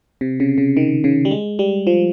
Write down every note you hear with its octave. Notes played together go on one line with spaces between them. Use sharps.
C3
C#3
C#3
D#3
C#3
G3
G#3
G3
F3